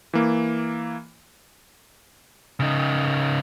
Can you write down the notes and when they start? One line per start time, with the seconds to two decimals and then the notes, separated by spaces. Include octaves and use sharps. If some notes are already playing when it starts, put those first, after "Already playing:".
0.13 E3 A#3
2.60 C#3 D#4